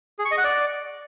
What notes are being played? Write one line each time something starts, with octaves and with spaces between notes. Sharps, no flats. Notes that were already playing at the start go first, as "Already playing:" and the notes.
G#4
C#6
D#5
F#5
D5